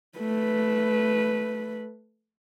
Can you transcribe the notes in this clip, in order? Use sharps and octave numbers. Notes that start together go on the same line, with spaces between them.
A3 B4